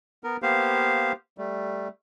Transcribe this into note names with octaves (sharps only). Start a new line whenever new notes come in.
B3 A#4
A#3 B3 G4 C5 F5
G3 A3